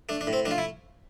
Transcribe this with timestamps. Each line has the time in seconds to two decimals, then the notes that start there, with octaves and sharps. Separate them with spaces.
0.09 A3 D4
0.21 D4
0.27 A2
0.33 C4
0.45 A3 D4
0.51 F4
0.58 E4